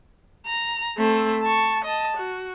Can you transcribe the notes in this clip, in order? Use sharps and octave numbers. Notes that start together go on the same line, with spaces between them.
A#5
A3 C4
A5 C#6
D#5 A5
F#4